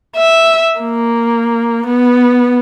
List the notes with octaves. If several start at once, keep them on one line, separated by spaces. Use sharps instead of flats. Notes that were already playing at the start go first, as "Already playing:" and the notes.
E5
A#3
B3